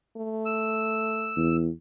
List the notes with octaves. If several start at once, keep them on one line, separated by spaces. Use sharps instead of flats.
A3
E6
E2